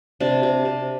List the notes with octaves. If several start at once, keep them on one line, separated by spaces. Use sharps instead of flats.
C3 D4
C3
C3